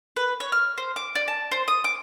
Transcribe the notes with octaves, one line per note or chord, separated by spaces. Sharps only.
B4
C#5
F6
C5
D6
D5
A5
C5
D#6
D6